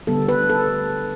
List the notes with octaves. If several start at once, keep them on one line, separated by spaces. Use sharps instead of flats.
D3 G3 B3 A4
B4
A4